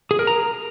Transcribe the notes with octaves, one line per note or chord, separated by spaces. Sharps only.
G#4
A#4
A#5